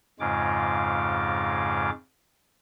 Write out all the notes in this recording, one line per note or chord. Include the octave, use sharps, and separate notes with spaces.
F2 G#2 C#3 G#3 F4 D6